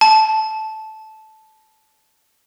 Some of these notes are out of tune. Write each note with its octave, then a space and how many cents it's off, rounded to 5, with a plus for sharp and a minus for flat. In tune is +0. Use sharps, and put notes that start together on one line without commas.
A5 -10